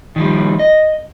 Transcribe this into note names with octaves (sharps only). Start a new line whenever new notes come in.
D#3 F3 G3
D#5